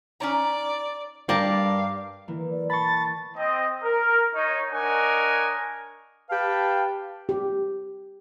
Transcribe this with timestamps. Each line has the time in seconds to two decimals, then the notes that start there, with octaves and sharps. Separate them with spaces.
0.20 C#4 D#4 D5 A#5
1.29 G2 G4 A#4 D5 F5 A5
2.28 E3 A#3
2.51 D5
2.70 A5 B5 C#6 A6
3.37 C4 D#5
3.83 A#4
4.35 D#4 C#5
4.71 D4 A#4 C#5 D#5 F#5 G#5
6.30 G4 B4 F5 G5 A5
7.29 G4